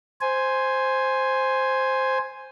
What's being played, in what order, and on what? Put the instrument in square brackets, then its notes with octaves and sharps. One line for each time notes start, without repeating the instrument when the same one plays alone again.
[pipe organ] C5 G#5